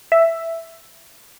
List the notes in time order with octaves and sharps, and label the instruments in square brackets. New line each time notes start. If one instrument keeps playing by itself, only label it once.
[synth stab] E5